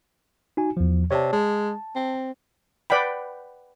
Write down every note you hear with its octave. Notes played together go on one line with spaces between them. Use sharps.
D#4 F#4 G#5
E2 F3
C3 C#5 D5 A5
G#3 A5
C4
B4 D5 F#5 G5 B5